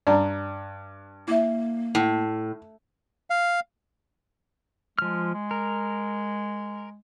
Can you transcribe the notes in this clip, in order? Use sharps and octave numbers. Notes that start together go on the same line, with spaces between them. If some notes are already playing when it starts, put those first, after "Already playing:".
G2 D5 A5 A#5
A#3 E4 E5
A2
F5
F3 G#3 F6
G#3
A#4